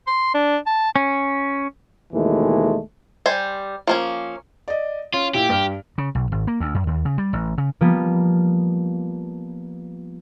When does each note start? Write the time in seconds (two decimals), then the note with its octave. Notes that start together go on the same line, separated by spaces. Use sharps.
0.07 C6
0.34 D4
0.66 A5
0.96 C#4
2.13 D#2 B2 E3 G#3 A3
3.26 G3 C5 G#5
3.87 F3 A#3 C#4
4.68 D5 D#5
5.14 C#4 F4
5.34 A#2 E4 G4
5.49 G2 F6
5.98 C#3
6.15 B1
6.32 G#1
6.47 A#3
6.60 D2
6.75 F#2
6.87 D#2
7.05 C#3
7.18 G3
7.33 A1
7.58 C#3
7.81 F3 G3 A#3 B3